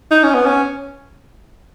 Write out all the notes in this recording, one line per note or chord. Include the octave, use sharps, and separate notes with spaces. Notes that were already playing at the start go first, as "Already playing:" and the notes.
D#4
C#4
B3
C#4